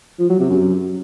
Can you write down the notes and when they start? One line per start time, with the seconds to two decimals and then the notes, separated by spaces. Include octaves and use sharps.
0.19 F3
0.30 F#3
0.40 C3
0.50 F#2